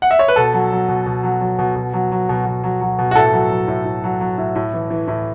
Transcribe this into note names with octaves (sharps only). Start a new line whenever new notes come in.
F#5
E5
C#5
B4
B2 A4
F#3
F#3
B2
B2
F#3
F#3
B2
B2
F#3
F#3
B2
B2
F#3
F#3
B2
F#4
A2 A4
F#3
F#3
A2
A2
F#3
F#3
A2
A2
E3
E3
A2